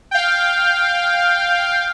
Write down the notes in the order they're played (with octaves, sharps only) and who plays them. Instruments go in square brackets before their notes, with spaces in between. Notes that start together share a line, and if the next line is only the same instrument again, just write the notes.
[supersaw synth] F5 G5